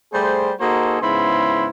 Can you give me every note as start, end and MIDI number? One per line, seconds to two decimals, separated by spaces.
0.14 0.52 55
0.14 0.52 57
0.14 0.52 68
0.14 0.52 72
0.60 0.98 58
0.60 0.98 63
0.60 0.98 66
0.60 0.98 68
0.60 0.98 69
0.60 0.98 72
1.01 1.68 44
1.01 1.68 49
1.01 1.68 59
1.01 1.68 64
1.01 1.68 83
1.01 1.68 84